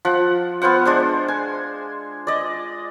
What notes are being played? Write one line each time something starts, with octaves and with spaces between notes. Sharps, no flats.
F3 F#5
B3 F4 C5 F#5
G#3 D4 C5
G#5
D5 D#5